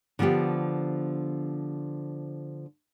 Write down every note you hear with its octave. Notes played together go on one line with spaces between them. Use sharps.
D3 F3 B3 F4 G4